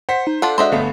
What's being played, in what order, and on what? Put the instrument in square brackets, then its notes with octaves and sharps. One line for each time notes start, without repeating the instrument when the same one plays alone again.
[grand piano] C5 B6 [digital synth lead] F#5
[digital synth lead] D#4
[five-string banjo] D4 F4 F#5 [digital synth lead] A4
[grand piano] G#3 D4 F#4 [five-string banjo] C5 D#5 E5
[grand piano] G1 A3 B3 [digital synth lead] F5